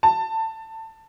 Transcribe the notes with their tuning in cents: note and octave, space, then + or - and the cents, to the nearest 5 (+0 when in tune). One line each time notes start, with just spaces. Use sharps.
A5 +20